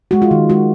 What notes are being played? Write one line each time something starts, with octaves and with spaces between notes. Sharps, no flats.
G#3 F#4
F4
D#3
G#3 F#4